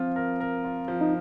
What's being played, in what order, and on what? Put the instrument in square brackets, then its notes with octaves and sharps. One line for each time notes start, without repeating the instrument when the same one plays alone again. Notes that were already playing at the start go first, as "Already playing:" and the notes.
Already playing: [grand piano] F3 F4 [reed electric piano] C4
[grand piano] A#4
A#4
F4
F3
[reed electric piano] D#4